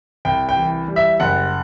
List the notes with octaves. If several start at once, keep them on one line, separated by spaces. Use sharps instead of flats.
C2 G5
G5
E3
G3
E5
F#1 F#5